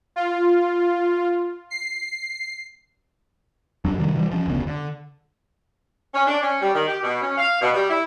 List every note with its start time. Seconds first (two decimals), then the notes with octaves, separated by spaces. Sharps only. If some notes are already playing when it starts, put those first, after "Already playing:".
0.16 F4
1.70 C7
3.85 F2 F#3 D4
3.98 C3 D#3 F#3 G3
4.17 E3 G3
4.31 F3 C#4
4.46 F1 D2 C#3 B3
4.67 D3
6.14 C#4
6.27 D4
6.42 C#4
6.61 G3
6.74 D#3
6.88 G4
7.03 B2
7.22 C#4
7.38 F5
7.62 B2
7.74 G3
7.90 E4